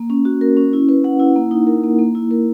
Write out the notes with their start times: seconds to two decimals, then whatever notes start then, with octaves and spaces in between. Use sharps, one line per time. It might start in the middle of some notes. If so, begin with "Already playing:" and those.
Already playing: A#3
0.10 C#4
0.25 F#4
0.41 A#4
0.57 C#4
0.73 E4
0.89 B4
1.04 F#5
1.20 E4
1.36 A#3
1.51 D#4
1.67 A#4
1.84 A#3
1.99 A#3
2.15 E4
2.31 A#4